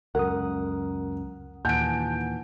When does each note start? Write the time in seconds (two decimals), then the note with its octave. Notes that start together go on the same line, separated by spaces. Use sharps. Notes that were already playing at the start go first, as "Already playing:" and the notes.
0.15 C#2 F#2 A#4 F#5 D#6
1.65 D#2 A#2 E3 F#5 G#5 A5 G6 D7